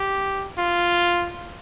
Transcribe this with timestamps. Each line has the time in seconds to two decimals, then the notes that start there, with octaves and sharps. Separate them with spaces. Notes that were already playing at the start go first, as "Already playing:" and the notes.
Already playing: G4
0.58 F4